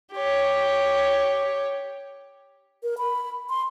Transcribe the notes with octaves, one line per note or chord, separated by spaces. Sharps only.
G4 C#5
A#4
B5
C6